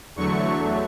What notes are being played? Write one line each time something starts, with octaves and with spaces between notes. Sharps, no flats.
E2 D3 F#3 A3 C#6